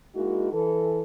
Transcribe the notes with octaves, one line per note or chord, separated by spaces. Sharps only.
G#3 A#3 D#4 E4 F#4
E3 A4